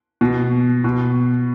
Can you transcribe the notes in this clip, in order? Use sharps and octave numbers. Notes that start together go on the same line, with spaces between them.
B2
B2